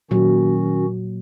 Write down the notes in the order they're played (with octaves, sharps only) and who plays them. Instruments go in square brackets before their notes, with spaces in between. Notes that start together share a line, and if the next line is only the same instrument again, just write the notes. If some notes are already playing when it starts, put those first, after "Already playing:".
[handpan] A#2 F#3 [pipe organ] D#3 C#4 F#4